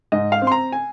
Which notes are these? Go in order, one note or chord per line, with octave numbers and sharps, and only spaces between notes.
G#2 D#5
F5
C4
C6
A#5
G#5